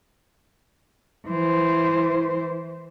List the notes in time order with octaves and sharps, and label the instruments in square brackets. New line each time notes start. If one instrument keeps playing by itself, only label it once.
[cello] E3 C5